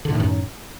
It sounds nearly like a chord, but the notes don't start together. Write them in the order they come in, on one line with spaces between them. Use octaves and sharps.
D3 A2 D#3 F#2